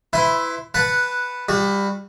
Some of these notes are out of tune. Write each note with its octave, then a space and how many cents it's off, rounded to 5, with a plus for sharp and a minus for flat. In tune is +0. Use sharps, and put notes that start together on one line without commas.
E4 +0 B4 +30 C6 +0
B4 +0 F#5 -5 A5 +0
G3 +15 F#4 -25